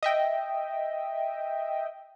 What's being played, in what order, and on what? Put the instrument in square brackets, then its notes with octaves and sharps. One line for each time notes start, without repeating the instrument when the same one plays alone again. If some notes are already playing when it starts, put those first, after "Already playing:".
[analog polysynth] D#5 E5 G5